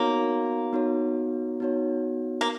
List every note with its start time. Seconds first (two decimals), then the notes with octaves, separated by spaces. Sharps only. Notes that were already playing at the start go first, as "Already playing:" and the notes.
Already playing: A#3 B3 D#4 F#4 C#5
0.73 B3 D#4 F#4 C#5
1.60 B3 D#4 F#4 C#5
2.41 A#3